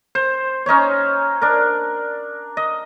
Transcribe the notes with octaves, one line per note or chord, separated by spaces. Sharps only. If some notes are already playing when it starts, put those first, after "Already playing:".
C5
C#4 D#4 C5 C#5
D4 A#4
D#5